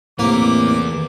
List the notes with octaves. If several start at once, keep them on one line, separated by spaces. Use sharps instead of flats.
E2 A2 C3 A#3 B4 D6